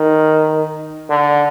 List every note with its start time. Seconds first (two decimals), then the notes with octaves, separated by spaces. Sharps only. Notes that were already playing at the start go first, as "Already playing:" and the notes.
Already playing: D#3
1.10 D3